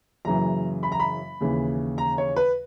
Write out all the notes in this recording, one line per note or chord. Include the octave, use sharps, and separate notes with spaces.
F#1 F#2 C#3 E3 A#5
B5
A#5
B5
D#2 C#3 E3
A#5
C#5
B4